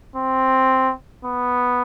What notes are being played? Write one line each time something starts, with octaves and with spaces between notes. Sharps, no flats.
C4
B3